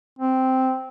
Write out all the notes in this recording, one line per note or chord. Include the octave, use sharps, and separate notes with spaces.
C4